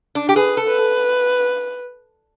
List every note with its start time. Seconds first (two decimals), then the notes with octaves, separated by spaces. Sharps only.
0.15 D4
0.29 G4
0.36 G#4 B4
0.57 A4
0.67 B4